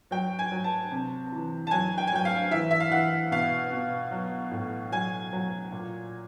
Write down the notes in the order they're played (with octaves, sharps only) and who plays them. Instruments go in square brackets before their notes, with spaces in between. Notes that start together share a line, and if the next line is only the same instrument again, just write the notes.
[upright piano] F#3 G5
G#5
F#3
A5
C3
E3
A5
F#3 G#5
G5
G#5
F#3 G5
F5
E3 E5
E5
F5
E3 F#5
B2 F5
B2
F#3
A2
F#3 G#5
F#3
A#2